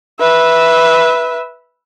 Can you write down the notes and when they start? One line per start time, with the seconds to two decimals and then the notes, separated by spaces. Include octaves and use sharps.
0.20 B4 E5